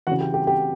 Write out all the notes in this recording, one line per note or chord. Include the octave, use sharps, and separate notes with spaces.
C#3 E3 F#4 F#5
G4 G5
G4 G5
G4 G5